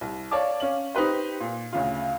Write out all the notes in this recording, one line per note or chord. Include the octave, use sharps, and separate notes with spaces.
C2
C#5 D5 F5 A5 D6
C#4 F5 F#7
D#4 G4 B4 C5
A#2
D2 C#3 F4